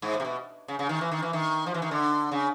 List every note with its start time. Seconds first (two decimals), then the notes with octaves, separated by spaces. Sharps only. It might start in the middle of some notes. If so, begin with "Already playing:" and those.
0.02 G#2
0.14 A2
0.20 C3
0.25 B2
0.68 C#3
0.79 C#3
0.89 D#3
1.01 E3
1.11 D#3
1.23 E3
1.33 D#3
1.66 F3
1.74 E3
1.82 D#3
1.91 D3
2.31 C#3